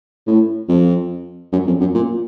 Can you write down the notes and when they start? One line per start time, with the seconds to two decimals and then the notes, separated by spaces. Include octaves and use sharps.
0.27 A2
0.69 F2
1.52 F#2
1.66 F2
1.80 F#2
1.95 A#2